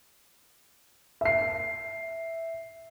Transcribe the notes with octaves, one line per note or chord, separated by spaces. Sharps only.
E5 C7